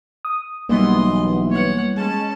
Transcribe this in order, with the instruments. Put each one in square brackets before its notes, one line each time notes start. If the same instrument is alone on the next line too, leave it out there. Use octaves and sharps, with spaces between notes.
[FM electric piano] D#6
[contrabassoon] B1 [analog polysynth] E3 B3 [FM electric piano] G3 A#3 [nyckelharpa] D#5 C6
[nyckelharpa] C#5 F#5
[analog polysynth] G#3 [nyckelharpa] C#4 A5